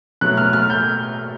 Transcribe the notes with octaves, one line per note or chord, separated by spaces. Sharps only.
B2 F#3 A3 F#6
F6
F6
G6